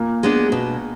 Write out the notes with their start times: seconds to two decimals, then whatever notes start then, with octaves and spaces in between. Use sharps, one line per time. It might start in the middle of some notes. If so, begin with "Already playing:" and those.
Already playing: A#2 A#3
0.23 G#3 B3 D4
0.52 B2